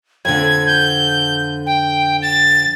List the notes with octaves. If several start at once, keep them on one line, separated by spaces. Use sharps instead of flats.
F2 D3 G#6
G6
G5
A6